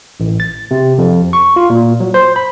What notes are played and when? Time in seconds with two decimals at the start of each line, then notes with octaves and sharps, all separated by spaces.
0.20 A1
0.40 A6
0.71 C3
0.98 F2
1.33 C#6
1.56 F4
1.70 A#2
2.00 F#3
2.14 C5
2.36 B5